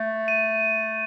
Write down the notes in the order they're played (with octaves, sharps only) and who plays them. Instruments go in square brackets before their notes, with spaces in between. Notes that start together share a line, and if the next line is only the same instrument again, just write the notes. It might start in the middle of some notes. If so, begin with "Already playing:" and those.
Already playing: [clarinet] A3
[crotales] D#7